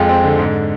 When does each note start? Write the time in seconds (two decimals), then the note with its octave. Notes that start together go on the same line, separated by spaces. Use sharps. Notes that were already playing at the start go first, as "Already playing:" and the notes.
Already playing: F2 G#3 F4
0.09 C4
0.24 D3
0.39 G#2